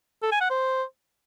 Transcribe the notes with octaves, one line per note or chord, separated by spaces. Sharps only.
A4
G#5
F#5
C5